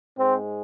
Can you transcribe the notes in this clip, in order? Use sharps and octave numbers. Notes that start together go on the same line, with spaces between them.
G#2 G#3 C4